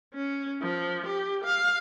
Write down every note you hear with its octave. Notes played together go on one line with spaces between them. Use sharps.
C#4
F3
G4
F5